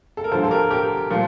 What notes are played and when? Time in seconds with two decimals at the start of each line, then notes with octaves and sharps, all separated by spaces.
0.17 A4
0.24 A#4
0.32 D2 D3 F3 A4 C5
0.44 A4
0.51 G4 A#4
0.71 G4 A#4
1.10 A#2 F3